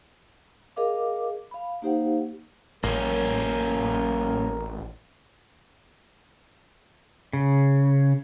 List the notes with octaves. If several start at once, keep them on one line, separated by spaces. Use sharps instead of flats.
G#4 A#4 D#5 F5 D6
F5 B5
A#3 D#4 G4 C5 F5 F#5
A1 A#3 C#4 A#4
C#3